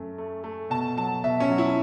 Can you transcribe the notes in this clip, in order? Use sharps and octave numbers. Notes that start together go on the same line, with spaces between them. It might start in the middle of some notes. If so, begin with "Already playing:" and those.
Already playing: F#2 A3
A3
A3
B2 A5
F#3 A5
B2 E5
C#4
F#3
E4